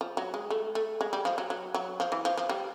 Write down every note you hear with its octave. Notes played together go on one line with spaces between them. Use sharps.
F3
F#3
G#3
A3
A3
G#3
G3
F3
F#3
F#3
F#3
F3
E3
F3
F3
G3